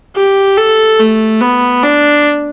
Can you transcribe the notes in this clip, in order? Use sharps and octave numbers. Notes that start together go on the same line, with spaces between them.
G4
A4
A3
B3
D4